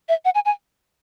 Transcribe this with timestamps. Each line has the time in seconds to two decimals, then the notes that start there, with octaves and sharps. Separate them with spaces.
0.09 E5
0.25 F#5
0.35 G#5
0.45 G#5